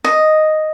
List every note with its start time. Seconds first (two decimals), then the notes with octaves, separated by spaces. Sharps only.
0.04 D#5